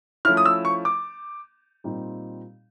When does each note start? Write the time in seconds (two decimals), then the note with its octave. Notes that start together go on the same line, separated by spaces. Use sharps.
0.25 F3 A3 C#4 E4 F6
0.37 D#6
0.46 E6
0.65 C#6
0.85 D6
1.84 A#2 G3 C4 D#4